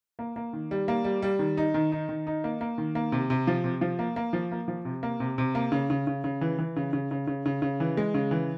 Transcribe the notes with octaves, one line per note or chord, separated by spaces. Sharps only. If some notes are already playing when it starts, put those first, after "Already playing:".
A#3
A#3
D#3
G3
A#3
G3
G3
D#3
D#4
D#3
D#4
D#3
D#4
A#3
A#3
D#3
A#3
C3
C3
F3
C3
F3
A#3
A#3
F3
A#3
F3
C3
A#3
C3
C3
A#3
C#3
C#3
C#3
C#3
E3
E3
C#3
C#3
C#3
C#3
C#3
C#3
E3
G#3
C#3
E3